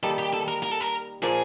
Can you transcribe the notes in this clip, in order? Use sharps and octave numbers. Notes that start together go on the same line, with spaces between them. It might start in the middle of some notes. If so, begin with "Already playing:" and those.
D#3 G3 A#3 D#4 A4
G4
A4
A#4
A#4
A4
A#4
A#2 F3 A#3 G#4